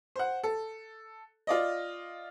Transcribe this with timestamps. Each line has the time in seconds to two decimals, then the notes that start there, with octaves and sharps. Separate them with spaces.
0.16 C5 F#5
0.44 A4
1.47 F4 D5 D#5